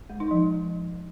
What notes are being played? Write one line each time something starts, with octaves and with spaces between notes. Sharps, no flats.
G#3
D#4
F3